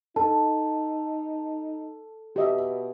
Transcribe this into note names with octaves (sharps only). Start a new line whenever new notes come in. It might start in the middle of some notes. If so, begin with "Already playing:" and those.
D#4 A4 A5
B2 G4 D#5 E5